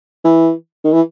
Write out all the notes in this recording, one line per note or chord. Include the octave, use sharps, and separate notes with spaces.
E3
D#3
E3